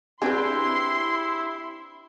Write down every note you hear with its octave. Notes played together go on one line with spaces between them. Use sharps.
C4 D4 E4 G4 G#4 B4 C6